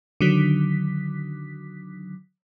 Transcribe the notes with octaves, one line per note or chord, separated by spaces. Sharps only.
D3 D#3 F#3 B6